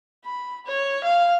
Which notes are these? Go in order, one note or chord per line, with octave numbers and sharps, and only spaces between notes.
B5
C#5
F5